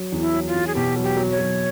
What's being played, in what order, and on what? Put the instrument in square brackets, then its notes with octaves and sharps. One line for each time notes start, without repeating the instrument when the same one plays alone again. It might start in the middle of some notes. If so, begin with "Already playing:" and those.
Already playing: [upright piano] F#3
E2
[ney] E4
[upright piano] F#3
[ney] F4
[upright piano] E2
[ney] G#4
[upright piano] B2 [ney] G4
[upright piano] F#3
[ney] G4
[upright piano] F#3
[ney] C#5
[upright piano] F#3